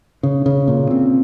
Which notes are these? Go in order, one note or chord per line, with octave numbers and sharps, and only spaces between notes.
C#3
C#3
A#2
C4